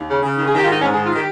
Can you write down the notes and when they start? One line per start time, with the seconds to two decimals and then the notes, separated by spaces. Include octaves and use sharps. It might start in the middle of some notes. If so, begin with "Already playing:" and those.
Already playing: D#2
0.08 C#3
0.22 C#3
0.37 D#3
0.47 G#4
0.52 D#3 G4
0.64 G#2 F4
0.72 D#4
0.81 G#2 C#4
0.93 G#4
0.96 D#3
1.04 F4
1.11 D#3 G4